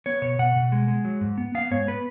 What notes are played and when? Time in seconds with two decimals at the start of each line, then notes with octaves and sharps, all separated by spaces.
0.06 B3 C#5
0.22 B2 C#5
0.39 B2 F#5
0.56 B2
0.72 G#3
0.88 G#3
1.05 F#3
1.21 G#2
1.38 B3
1.55 B3 F5
1.71 G#2 C#5
1.87 B3 B4